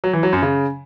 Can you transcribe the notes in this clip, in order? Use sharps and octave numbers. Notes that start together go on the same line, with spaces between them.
F#3
E3
F#3
F#2
C#3